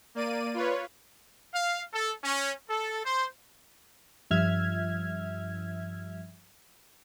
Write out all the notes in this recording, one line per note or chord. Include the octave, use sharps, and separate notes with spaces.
A#3 D5 D#7
F4 B4 C#5
F5
A4
C#4
A4
C5
G2 F3 E5 F6 G#6